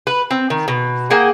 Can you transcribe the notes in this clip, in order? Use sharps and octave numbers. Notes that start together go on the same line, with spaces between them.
B4
C4
D#3
B2
A#3 G#4 F#5 G5